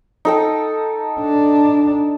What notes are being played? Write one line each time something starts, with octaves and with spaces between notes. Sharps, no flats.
D#4 A4 G5
D4